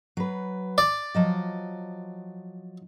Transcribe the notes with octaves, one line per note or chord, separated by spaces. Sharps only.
F#3 B4
D5
F3 F#3 D#5